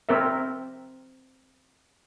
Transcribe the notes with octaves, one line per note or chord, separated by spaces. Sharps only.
C4 A#4 E5